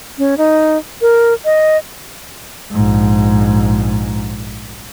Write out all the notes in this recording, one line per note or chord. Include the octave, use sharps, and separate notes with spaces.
C#4
D#4
A#4
D#5
A#1 G#2